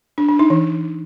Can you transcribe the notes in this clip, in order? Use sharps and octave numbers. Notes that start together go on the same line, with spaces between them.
D4
D4
D#4
E3